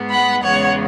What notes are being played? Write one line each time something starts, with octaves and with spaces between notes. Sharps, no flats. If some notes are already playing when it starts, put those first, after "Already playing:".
Already playing: G#2 G#3 B3
F#5 B5
E2 C#3 G#3 B3 C#5 F#5